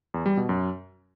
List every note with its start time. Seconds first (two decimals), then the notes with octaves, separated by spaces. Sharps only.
0.14 E2
0.26 G3
0.37 B2
0.49 F#2